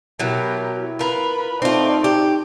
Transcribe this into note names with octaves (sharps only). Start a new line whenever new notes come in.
B2 F#3 E4 G4 A#4
F4 A#4 B4 B5
A3 C4 D#4 F4 D5
G4